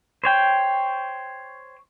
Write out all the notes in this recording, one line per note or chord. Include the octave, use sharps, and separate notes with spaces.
C5 C#5 G5